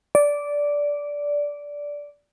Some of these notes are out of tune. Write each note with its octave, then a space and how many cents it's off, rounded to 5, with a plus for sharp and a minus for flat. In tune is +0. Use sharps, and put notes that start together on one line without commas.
D5 -10